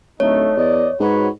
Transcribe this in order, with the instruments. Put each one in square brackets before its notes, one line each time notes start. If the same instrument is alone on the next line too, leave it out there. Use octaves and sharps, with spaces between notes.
[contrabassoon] D1 [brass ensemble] A3 D#4 [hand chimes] C#5
[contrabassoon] E2 [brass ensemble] D5 D#5
[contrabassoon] G#2 [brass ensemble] F#4 B4 C#5